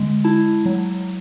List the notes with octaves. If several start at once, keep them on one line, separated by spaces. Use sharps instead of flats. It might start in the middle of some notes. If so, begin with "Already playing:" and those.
Already playing: D3 G#3
E4 A5
F#3